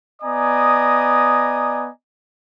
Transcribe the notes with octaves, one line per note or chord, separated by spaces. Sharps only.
B3 D5 D#5 G#5 A#5 D#6